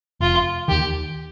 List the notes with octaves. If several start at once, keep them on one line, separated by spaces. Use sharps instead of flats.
F1 F4
D#2 D#3 G4